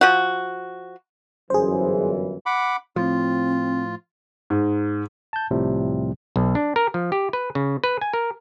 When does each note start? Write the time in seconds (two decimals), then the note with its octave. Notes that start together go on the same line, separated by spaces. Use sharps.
0.01 F3 F#4
1.50 G1 F#2 E3 G#4 C5
2.46 F#5 B5 D6
2.96 A2 F3 C4 F4
4.50 G#2
5.33 A5 G6
5.51 C2 A2 C3 F3 G3
6.36 B1
6.55 D4
6.76 A#4
6.94 F3
7.12 G4
7.33 B4
7.55 C#3
7.84 B4
8.01 G#5
8.13 A#4